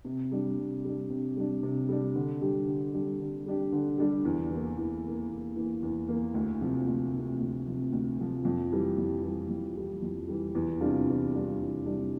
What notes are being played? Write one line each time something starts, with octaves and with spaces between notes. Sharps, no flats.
C3
G3 D4
C3
G3 D4
C3
G3 D4
C3
G3 D4
D3
G3 D4 G4
D3
G3 D4 G4
D3
G3 D4 G4
D3
G3 D4 G4
E2
E3 A#3
E2
E3 A#3
E2
E3 A#3
E2
E3 A#3
D2
C3 F3
D2
C3 F3
D2
C3 F3
D2
C3 F3
F2
E3 G3
F2
E3 G3
F2
E3 G3
F2
E3 G3
E2
C3 G3 D4 F4
E2
C3 G3 D4 F4
E2
C3 G3 D4 F4